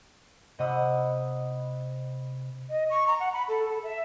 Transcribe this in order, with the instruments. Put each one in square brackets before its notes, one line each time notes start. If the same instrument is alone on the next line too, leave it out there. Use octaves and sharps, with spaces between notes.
[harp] C3 D#5 F#5 B5 D#6 E6
[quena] D#5
C#6
A#5
F#5
B5
A4
A4
E5